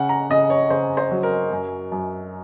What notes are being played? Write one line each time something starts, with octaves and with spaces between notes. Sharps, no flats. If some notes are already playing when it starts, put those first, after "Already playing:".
Already playing: C#3 F#5
A#5
C#3 D#5
C#5
C#3 C5
C5
F#3
A#4
F#2
F#2